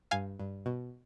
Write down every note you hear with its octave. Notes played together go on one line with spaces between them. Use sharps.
G2 F5 G#5
G2
B2